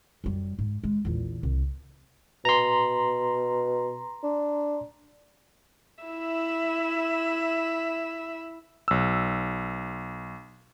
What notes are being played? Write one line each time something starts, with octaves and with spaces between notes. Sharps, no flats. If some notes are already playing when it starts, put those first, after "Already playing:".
F#2 G3
G#2
G#3
A#1 E2
C2
B2 A#5 C6
D4
E4 E5
B1 E6